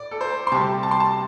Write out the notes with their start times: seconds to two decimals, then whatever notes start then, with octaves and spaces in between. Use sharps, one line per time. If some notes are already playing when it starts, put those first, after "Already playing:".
Already playing: A2 D5
0.11 A4
0.21 C5
0.47 C6
0.52 C3 G3 A5
0.83 A5
0.91 C6
1.00 A5